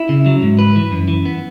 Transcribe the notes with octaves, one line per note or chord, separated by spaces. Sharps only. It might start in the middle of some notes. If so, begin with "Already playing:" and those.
Already playing: E4
C#3
F#3
G#2
B4
E3
F#2
E3
B3